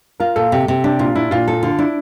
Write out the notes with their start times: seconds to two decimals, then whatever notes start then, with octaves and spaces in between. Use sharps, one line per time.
0.20 F4 A#4
0.36 A#2 A4
0.52 C3
0.68 C3
0.84 D4 G4
0.99 A#2 F4
1.15 D4 E4
1.31 A#2 F4
1.48 F4 A4
1.63 D3 F4
1.79 D4 E4